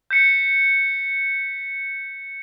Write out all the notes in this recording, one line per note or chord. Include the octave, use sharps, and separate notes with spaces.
G6 B6 C#7